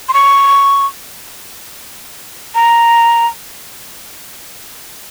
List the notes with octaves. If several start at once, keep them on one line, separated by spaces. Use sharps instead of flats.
C6
C#6
A#5